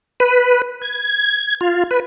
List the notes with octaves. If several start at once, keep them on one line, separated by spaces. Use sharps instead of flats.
B4
G#6
F4
B4